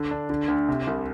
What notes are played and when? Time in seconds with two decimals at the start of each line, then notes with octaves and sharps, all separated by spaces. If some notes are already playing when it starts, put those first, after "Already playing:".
Already playing: D3
0.11 D4
0.30 D3
0.48 D2
0.69 C3
0.87 C2